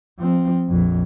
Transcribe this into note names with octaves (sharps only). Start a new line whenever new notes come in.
F3 C4
A#1 F2